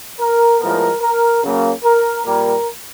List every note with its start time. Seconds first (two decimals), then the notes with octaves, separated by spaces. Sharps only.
0.20 A#4
0.60 A2 F3 G#3 B3 A#4
1.01 A#4
1.43 C#3 F#3 A#3
1.83 A#4
2.24 A#2 G3 A#3 A#4